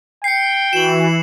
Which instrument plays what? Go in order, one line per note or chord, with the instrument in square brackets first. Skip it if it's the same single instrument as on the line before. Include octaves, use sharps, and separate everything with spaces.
[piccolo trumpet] G5 [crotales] C7 C#7
[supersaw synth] E3 [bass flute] F#4 [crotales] E7 F#7